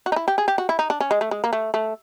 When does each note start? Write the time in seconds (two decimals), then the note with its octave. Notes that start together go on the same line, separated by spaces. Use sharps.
0.06 F#4
0.12 D#4
0.16 E4
0.28 G4
0.38 G#4
0.48 G4
0.58 F#4
0.69 E4
0.79 D#4
0.90 D4
1.00 C#4
1.11 G#3
1.21 A3
1.31 G#3
1.44 A#3
1.53 A3
1.74 A3